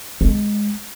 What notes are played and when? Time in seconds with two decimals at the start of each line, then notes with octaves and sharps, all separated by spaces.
0.21 G#3